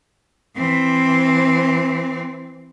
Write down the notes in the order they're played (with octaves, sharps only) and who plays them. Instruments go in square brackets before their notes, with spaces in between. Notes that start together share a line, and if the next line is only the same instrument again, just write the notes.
[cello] E3 C4